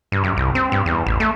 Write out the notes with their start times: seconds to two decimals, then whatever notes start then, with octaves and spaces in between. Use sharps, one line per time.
0.12 G2
0.24 F#2
0.37 C2
0.55 C4
0.72 G2
0.86 E2
1.06 A1
1.20 A3